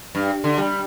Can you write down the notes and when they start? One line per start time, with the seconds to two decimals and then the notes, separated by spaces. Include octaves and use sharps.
0.15 G2
0.44 D3
0.58 G3